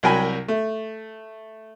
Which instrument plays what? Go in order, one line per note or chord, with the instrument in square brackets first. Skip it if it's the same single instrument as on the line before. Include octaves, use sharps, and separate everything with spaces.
[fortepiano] C2 F#3 A#4 G5 G#5 B5
A3